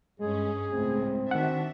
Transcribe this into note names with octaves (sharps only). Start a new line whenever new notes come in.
G2 G#3 C#4 G#4
C#2 A2 C4
D#3 D4 F#4 E5 F#5